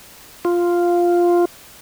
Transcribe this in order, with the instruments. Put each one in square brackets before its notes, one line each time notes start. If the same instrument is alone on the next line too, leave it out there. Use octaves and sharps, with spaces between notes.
[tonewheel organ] F4